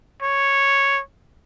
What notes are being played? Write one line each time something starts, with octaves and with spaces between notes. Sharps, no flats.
C#5